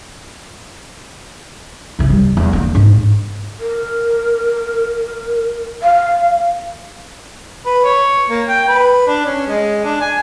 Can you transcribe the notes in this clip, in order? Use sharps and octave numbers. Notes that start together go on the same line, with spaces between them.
C#3 E3
G3
E2
D3 A#3
G#2 D4
A#4
F5
B4
C#5
A#3
G5
B4
D4
C#4
G#3
D4
G#5